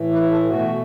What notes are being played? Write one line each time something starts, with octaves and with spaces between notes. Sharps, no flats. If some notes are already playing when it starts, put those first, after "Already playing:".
Already playing: A2 E3 A3
B4
A4
B2 A3 F#4